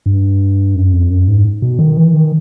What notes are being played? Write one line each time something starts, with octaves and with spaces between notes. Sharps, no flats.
G2
F#2
F2
F#2
G#2
B2
D#3
E3
D#3